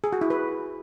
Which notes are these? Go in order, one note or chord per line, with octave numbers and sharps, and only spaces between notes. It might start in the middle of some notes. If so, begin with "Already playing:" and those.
G#4
F#4
E4
B4